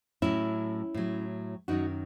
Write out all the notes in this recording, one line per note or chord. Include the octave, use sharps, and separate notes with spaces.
A2 F#3 C#4 E4
A2 F#3
F#2 D#3 F#3 D#4 F#4